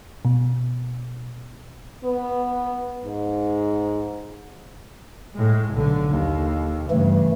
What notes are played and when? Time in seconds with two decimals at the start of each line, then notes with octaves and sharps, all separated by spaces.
0.25 B2
2.04 B3
3.06 G#2
5.34 A2 G#3
5.73 B1 D3
6.09 D#2
6.90 G2 C#3 E3 A3